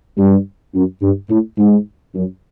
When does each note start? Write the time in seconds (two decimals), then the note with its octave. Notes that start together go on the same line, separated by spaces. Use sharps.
0.18 G2
0.74 F#2
1.02 G2
1.30 A2
1.58 G#2
2.15 F#2